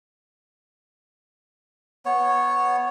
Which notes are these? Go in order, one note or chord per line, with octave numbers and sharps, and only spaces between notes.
B3 C#5